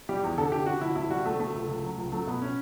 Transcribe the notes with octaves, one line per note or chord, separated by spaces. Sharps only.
G3 G4
E2
D3 A4
D3 G4
D3 F#4
D2 E4
D2 E4
G3 F#4
D2 A3
D2 A3
C#2
C#2
F#3
C#2
F#3 A3
B2 B3
C#4